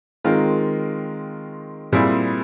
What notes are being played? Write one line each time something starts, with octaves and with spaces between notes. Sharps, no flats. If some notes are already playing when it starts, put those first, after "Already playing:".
D#3 G#3 C4 F4 A#4
A#2 G3 C4 E4 G#4